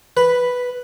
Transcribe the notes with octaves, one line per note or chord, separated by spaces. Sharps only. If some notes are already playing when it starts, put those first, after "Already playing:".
B4